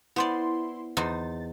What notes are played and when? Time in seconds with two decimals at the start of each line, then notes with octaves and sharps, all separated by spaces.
0.16 B3 E4 C5 D5 C6
0.97 E2 D#4 C5 A6